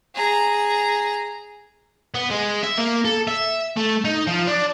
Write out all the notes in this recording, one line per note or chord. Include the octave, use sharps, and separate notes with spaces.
G#4 A#5
B3
G#3
E5
A#3
A4
E5
A3
D#4
F3
D4